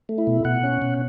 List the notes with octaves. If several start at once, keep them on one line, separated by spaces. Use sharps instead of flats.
A3
E4
B2
B2 F#5
C#4
B2